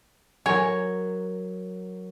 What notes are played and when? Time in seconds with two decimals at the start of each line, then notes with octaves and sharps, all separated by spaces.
0.46 F#3 A#4 C#5 G#5